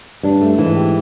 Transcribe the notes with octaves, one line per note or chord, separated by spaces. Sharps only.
G2 D4
A3
G#2 E3
G4